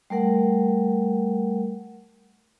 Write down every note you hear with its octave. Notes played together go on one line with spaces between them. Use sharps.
G3 A3 A#4 F#5